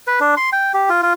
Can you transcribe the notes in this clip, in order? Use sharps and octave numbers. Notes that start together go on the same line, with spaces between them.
B4
D4
C6
G5
G4
F4
F4